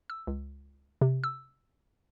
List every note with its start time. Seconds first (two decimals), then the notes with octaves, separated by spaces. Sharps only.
0.10 E6
0.27 C#2
1.01 C3
1.24 E6